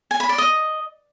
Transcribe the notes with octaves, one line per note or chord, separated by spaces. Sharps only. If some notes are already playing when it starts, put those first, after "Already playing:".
G#5
B5
D5
D#5